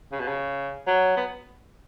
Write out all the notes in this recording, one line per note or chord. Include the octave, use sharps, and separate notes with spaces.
C#3
B2
C#3
F#3
B3